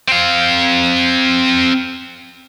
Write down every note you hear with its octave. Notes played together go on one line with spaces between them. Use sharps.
C4 F5